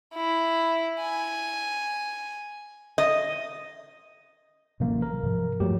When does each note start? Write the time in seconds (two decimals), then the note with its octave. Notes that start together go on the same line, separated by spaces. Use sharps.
0.14 E4
1.01 G#5
2.98 D#5
4.80 A1 C3 F#3 A#3
5.02 A#4
5.23 G#2 C3 F3
5.60 G2 F3 F#3 A3 G4